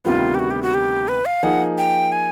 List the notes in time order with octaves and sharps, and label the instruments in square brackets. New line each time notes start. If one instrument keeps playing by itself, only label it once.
[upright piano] D2 C3 D#3 G3 B3 [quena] F4
[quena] G4
F#4
G4
F#4
G4
B4
F5
[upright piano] F3 A#3 D#4 G#4 [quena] F#5
[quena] G5
G#5